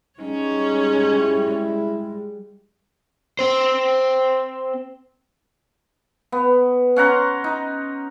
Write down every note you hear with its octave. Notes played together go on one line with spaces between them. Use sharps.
G3 G#3 C#4 D#4 C#5
E4
C4 C5
B3
C#4 F#5 A#5 C6
D#4